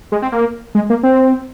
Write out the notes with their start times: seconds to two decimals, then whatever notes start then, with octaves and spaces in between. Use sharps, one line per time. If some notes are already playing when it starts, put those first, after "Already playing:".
0.12 G#3
0.22 C4
0.32 A#3
0.75 G#3
0.90 A#3
1.03 C4